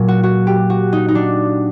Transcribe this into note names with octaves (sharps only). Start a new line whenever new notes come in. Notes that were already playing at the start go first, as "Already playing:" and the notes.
Already playing: A#2 F#3
F#4
F#4
G4
F#4
D#4
D#4
D4